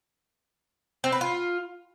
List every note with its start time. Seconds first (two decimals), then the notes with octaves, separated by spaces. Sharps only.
1.04 C4
1.12 B4
1.21 F4